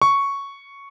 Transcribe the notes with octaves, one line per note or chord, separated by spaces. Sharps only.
C#6